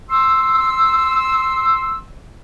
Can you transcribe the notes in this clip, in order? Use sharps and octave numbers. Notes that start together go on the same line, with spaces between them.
C6 E6